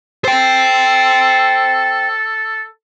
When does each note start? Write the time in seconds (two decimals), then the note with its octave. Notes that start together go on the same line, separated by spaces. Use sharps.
0.25 A4 C5 G5